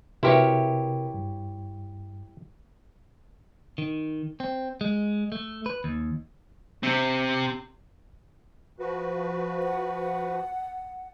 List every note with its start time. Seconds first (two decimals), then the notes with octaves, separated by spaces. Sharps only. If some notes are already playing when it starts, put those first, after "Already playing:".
0.23 C3 E4 F#4 G4 A#4 B4 C#5 E5
1.14 G2
3.78 D#3
4.40 C4
4.81 G#3
5.32 A3
5.66 B4
5.84 D#2
6.83 C3 C4
8.79 F3 F#4 B4
9.63 F#5